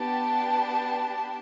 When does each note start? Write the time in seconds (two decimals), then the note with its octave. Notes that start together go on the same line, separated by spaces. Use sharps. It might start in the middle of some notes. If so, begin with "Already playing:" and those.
Already playing: B3 D4 G4 A5